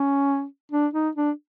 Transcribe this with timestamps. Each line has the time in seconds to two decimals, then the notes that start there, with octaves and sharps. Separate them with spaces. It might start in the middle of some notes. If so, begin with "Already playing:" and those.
Already playing: C#4
0.72 D4
0.94 D#4
1.15 D4